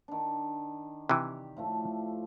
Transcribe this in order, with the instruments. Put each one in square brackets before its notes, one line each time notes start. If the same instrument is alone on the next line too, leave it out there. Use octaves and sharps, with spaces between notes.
[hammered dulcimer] D#3 D4
[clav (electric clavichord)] C3 E3 [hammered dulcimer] G4
[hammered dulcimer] A2 F3 A3